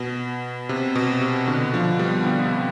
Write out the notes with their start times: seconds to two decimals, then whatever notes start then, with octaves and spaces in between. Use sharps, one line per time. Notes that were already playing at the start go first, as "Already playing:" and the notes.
Already playing: B2
0.69 C3
0.95 B2
1.21 C3
1.47 B2 D3
1.73 D3 F3
1.99 G3 B3
2.25 B2 D3
2.45 C3